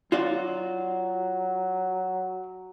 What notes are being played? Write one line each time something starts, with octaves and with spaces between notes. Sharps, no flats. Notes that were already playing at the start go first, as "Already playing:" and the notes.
F#3 F4 F#4 D5